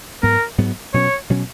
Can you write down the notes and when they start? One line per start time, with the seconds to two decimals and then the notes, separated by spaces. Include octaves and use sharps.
0.23 G#2 F#3 B3 A#4
0.58 G#2 F#3 B3
0.94 B2 F#3 C#4 C#5
1.30 B2 F#3 C#4